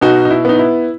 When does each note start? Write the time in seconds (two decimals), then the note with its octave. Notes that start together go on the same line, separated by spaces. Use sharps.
0.01 B2 D#4 F#4
0.25 D#4
0.30 E4
0.45 B3 D#4
0.59 E4